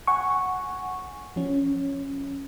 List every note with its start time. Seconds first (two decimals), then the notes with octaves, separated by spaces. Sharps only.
0.07 F#5 G#5 C#6
1.36 F3 C#4